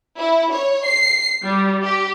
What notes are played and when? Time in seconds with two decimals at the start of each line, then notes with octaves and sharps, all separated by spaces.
0.19 E4
0.52 C#5
0.86 C7
1.43 G3
1.83 G4